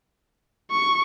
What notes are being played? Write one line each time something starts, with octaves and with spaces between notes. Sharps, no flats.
C#6